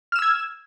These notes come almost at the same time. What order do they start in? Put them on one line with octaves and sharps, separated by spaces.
F6 E7 E6 G#6